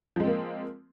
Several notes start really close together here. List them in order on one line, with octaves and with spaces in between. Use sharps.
F3 G#3 C4 A#3